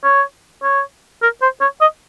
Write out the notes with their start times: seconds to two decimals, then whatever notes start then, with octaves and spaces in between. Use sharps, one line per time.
0.04 C#5
0.63 C#5
1.22 A#4
1.42 C5
1.61 C#5
1.81 D#5